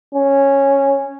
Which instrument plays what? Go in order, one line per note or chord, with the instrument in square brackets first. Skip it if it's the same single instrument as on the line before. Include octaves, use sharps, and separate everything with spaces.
[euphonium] C#4